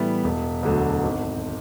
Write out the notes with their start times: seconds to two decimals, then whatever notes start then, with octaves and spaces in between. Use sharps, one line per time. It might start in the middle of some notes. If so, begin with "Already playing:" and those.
Already playing: A2 E3 G3 B3
0.24 E1
0.63 D2 D3 F#3
1.03 G#1